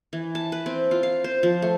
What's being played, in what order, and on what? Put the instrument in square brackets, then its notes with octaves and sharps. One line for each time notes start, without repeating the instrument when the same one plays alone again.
[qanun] E3
A5
B4
C4
F4
F5
C5
F3
A3